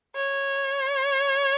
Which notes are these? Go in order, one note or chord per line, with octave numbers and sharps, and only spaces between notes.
C#5